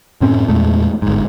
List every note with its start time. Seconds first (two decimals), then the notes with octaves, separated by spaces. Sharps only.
0.21 F#2 A2 C4 C#4
0.48 E2 A#2 G#3 A3
1.02 G1 G#2